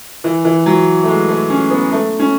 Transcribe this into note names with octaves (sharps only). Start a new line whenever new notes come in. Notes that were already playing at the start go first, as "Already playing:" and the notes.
E3
E3
F#3
A3
G#3
A3
C#4
B3
A3
C#4